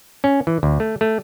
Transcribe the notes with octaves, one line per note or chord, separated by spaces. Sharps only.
C#4
E3
D2
A3
A3